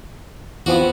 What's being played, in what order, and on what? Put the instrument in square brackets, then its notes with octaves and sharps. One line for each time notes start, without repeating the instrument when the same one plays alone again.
[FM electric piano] E2 F3 C4 [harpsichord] B3 F#4